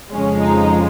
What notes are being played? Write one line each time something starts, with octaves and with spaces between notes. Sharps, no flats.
F2 C#3 F3 G#3 C#4
D#4